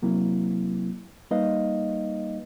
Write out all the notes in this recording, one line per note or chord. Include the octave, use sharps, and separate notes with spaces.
C3 F#3 A#3 C4 E4
G3 A#3 D#4 B4 D#5 F5